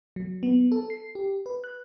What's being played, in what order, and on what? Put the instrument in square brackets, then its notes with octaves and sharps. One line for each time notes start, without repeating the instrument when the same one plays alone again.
[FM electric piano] F#3
B3
A4
C7
G4
B4
F#6